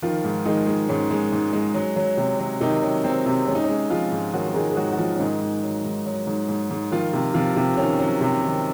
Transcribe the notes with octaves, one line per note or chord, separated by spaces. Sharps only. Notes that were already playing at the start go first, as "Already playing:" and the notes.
D#3 F3 F4
G#2
D#3 G#3 D#4
G#3
G#2 C#4
G#3
G#2
G#3
F#3
F#3
C3
F#3
C3 D#3 D#4
F#3
F#3 C4
C3
G#3 C#4
D#4
C#4
G#3
F3 G#3 F4
G#2
D#3 F#3 F#4
A#4
D#3 G#3 G#4
G#4
G#2 F#3 F#4
F#4
F3 G#3 F4
C#4
G#2 D#3 D#4
G#2
F#3
G#2
F#3
G#2
G#2
G#2
D#3 F3 F4
C3
C3 F3 F4
C3
D#3 C#4
F#3
C3
D#3